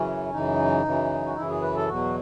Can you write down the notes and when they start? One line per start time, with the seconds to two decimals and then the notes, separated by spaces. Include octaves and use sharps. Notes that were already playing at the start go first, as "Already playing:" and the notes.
Already playing: F#2 C#3 E3 C#4
0.33 F#2 C#3 E3 D#4
0.85 F#2 C#3 E3
1.26 F#4
1.36 F#2 C#3 E3 E4
1.50 G#4
1.62 B4
1.76 A4
1.88 E2 B2 F#3 F#4